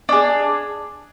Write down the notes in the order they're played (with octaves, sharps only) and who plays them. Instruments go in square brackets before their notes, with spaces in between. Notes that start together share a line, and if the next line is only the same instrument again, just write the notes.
[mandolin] D4 G#4